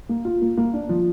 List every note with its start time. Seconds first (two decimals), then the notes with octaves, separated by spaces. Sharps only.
0.09 A#3
0.25 F4
0.42 A#3
0.57 A#3
0.73 D4
0.89 F3